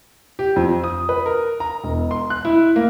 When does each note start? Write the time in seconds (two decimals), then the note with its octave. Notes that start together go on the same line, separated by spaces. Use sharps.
0.39 G4
0.56 F2
0.84 D#6
1.09 B4
1.26 A#4
1.60 A#5
1.83 E1
2.11 C6
2.30 F#6
2.45 E4
2.76 A#3